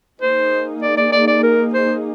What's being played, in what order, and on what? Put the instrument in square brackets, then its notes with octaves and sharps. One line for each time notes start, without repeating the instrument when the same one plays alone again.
[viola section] A#3 D#4 G#4 [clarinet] C5
[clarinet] D5
D5
D5
D5
A#4
C5